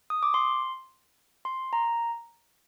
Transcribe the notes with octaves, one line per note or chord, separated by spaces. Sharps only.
D#6
D6
C6
C6
A#5